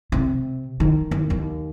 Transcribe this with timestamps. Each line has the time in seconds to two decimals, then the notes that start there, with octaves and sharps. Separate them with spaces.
0.12 C3
0.80 D#3
1.11 D#2
1.30 D#2